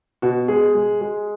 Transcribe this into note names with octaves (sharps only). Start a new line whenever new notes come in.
B2 F#4
G#3 G#4
G#3
G#3